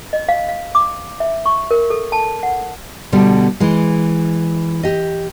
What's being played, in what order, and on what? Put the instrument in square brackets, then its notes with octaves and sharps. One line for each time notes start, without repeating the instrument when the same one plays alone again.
[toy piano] D#5
F5
F5
D6
E5
C#6
A#4
A4
A5
F#5
[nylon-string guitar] B2 D3 G3
E3 G#3
G4 D#5